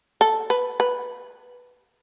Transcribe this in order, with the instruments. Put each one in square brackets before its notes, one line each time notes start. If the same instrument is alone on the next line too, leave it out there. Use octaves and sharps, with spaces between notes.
[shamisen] A4
B4
B4